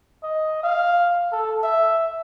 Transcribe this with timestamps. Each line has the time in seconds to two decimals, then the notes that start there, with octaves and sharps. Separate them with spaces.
0.23 D#5
0.63 F5
1.32 A4
1.63 E5